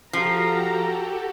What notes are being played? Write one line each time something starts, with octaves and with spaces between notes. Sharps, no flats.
F3 F#4 G4 A4 A#5